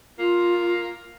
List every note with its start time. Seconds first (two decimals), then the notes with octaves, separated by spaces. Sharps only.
0.19 A#3 F4